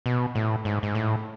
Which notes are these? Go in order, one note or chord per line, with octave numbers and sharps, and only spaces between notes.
B2
A2
G#2
G#2
A2